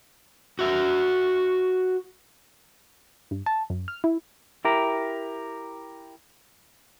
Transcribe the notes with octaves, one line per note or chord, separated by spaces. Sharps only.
F#4 E5
G2
A5
F#2
F6
E4
E4 G4 A#4